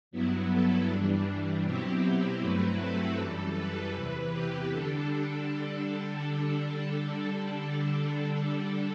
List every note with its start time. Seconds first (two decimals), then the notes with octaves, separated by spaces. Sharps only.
0.11 G2 F#3 B3 E4
0.49 A4
0.88 G2 E3 G3 D4
1.64 B2 F#3 C4 E4 G4
2.40 G2 F#3 A3 C4 E4 B4
2.79 A4
3.17 F#2 E3 G3 A4
3.55 B4
3.93 E2 C3 E3 B4
4.31 G4
4.69 D3 G3 D4 A4